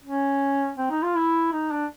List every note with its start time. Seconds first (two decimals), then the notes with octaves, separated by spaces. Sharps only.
0.04 C#4
0.78 C4
0.90 D#4
1.03 F4
1.16 E4
1.53 D#4
1.71 D4